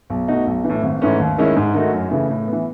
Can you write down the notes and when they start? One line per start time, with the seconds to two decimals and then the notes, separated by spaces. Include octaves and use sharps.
0.10 B1
0.28 B2 A3 D#4 F#4
0.47 B1
0.64 E3
0.69 A2
0.83 G#1
1.02 G#2 E3 A3 C#4
1.20 D#2
1.38 D#3 G#3 C#4 E4
1.56 G#2
1.74 D#3 A3 D#4 F#4
1.93 F#2
2.11 C#3 E3 A3
2.30 A2
2.48 B3
2.53 E3